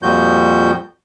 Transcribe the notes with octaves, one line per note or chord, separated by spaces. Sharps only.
F2 A#2 F3 G3 F#4 G6